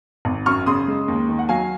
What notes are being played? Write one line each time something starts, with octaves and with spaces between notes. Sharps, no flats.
G#1
F#2 C#6 F6
C#3 C6 D#6
G#3
D#2
D#3
F#5
F#3 F5 G#5